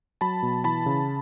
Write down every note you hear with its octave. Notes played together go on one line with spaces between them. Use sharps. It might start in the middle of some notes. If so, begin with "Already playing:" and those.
F#3 A5 B5
B2
E3 A5 B5
C#3